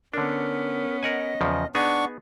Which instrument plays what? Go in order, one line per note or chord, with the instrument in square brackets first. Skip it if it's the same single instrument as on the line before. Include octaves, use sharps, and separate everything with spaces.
[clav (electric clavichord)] D3 D4 [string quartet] B3 C#4 [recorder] A#4
[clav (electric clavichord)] A#4 F#5 G#5 [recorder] D#5
[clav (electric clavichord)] E2 C#3 F3
[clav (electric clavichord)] B3 D#4 G#4 [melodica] D4 C#6 [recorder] F#5